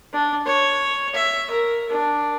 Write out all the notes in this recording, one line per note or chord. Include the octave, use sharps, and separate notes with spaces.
D4
C#5
E5
A#4
D4